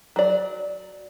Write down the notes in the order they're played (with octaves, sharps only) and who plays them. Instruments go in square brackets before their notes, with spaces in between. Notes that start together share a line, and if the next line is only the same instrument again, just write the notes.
[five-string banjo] F#3 D5